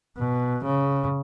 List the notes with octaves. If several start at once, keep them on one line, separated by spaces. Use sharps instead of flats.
B2
C#3